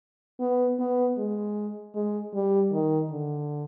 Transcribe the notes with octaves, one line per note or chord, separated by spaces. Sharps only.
B3
B3
G#3
G#3
G3
D#3
D3